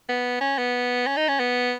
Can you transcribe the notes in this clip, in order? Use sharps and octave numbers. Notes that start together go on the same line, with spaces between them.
B3
C#4
B3
C#4
D#4
C#4
B3